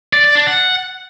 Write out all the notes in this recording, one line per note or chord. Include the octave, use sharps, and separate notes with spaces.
D5
D5
D4
F#5